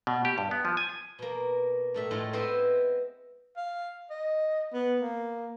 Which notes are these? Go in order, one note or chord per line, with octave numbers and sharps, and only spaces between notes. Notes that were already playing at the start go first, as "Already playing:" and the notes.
B2
G4
G2
B3
F3
G#5
B2 A#3
A2 A3 E5
A2 G#3 F4
B3 C4 E4 C5 D#5 E5
F5
D#5
B3
A#3